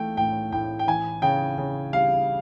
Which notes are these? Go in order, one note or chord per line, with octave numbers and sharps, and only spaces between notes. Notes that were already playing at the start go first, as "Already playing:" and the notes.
Already playing: E3 A3 G5
A2 G5
A2 G5
G5
E3 G#5
C#3 G5
C#3
G3 F5